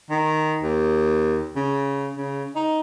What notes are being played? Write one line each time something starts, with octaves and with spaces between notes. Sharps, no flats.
D#3
D#2
C#3
C#3
D#4